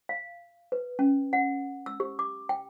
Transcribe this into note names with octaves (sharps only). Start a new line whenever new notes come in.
F5
B4
C#4
F#5
E6
G4
D6
G5